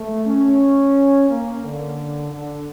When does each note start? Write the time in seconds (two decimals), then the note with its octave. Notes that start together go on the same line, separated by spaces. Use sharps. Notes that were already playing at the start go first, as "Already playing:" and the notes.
Already playing: A3
0.26 C#4
1.29 A#3
1.64 D3
2.31 D3